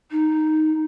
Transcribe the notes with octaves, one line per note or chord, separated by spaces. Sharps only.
D#4